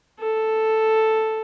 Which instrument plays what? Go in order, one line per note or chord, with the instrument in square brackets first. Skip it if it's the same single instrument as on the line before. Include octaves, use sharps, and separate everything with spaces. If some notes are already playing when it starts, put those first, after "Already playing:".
[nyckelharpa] A4